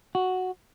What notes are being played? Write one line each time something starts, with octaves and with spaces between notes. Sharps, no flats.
F#4